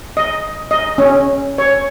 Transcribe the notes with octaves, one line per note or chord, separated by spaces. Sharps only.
D#5
D#5
C#4
C#5